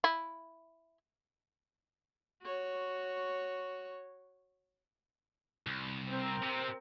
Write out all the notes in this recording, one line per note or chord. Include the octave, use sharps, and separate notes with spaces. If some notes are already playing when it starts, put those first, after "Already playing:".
E4
F#4 C#5
C2
C4 A#4
C3